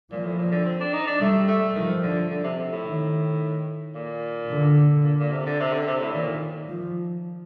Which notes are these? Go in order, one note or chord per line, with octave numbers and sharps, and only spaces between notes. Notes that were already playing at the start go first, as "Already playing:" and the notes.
A#2 F3
A2
A#2
D3
C4
D4
D#4
D4
G3 A3
A3
D#3 F3
D3
D3
C3
C3
A2
D#3
A#2
D3
A#2
A#2
C3
D3
C3
D3
C3
A2
A#2 D#3
F3